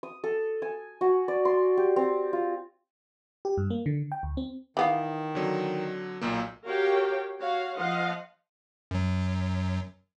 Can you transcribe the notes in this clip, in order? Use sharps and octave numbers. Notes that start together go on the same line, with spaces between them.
D#6
A4
G#5
F#4
D5
C6
G4
C4
F4
G4
G2
A#3
D3
G5
D2
C4
D#3 E3 B3 F5
D3 F#3 C4
B1 A#2 A#3
F#4 G4 A#4 C#5 F5 G5
F#4 C#5 F5
F3 D#5 F5 F#5 C6
F#2 F#3